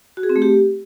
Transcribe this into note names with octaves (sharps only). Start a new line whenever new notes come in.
F#4
G#4
C4
A3
G4